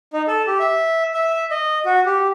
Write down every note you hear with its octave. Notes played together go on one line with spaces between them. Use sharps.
D#4
A4
G4
E5
E5
D#5
F#4
G4